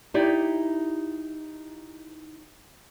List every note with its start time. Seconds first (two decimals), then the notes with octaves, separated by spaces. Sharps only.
0.14 D#4 E4 G4 D5